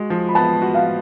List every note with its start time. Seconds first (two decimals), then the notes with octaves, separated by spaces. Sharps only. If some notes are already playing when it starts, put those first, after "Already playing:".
Already playing: G#3 F#4
0.10 F3
0.29 B5
0.35 B3 A5
0.62 F#4
0.75 F5